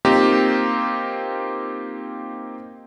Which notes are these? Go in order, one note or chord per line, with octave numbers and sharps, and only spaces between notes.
A#3 C4 D#4 F4 G4